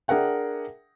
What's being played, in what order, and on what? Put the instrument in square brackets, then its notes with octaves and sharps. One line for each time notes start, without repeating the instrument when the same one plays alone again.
[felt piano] D4 G#4 A#4 E5 F#5 G5